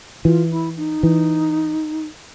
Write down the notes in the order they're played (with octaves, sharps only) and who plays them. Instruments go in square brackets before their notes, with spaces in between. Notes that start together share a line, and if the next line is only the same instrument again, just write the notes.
[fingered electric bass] E3 [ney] F4
[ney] E4
D#4
[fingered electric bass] E3